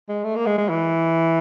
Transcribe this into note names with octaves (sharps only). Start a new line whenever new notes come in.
G#3
A3
A#3
G#3
G#3
E3